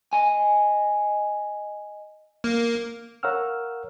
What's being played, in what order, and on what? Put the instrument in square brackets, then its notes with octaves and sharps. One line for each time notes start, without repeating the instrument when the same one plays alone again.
[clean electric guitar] D#5 G#5
[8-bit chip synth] A#3
[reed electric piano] A#4 C#5 F5 F#5 E6 F6